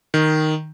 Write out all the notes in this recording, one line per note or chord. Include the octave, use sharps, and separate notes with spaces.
D#3